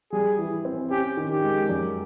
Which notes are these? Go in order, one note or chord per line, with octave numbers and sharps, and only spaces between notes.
G3 G#4
E3
C4
C#4 G4
D#3
G4
G#3
F#2